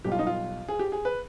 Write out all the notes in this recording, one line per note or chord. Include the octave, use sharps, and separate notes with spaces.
B1 B2 G3 G4
F4
D#4
F4
G#4
G4
G#4
B4